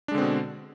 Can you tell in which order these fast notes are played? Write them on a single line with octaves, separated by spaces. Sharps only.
D4 G#3 D3 C4 B2